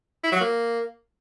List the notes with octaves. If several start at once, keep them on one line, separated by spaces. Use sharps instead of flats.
E4
F#3
A#3